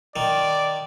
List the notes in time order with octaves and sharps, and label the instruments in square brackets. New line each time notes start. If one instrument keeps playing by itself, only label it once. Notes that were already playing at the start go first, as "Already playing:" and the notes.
[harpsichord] D#3 [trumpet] D5